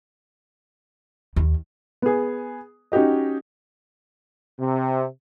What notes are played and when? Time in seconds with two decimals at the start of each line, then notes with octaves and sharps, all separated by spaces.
1.36 D#2
2.02 B3 G#4
2.92 C#4 D#4 F#4 G4 D#5
4.59 C3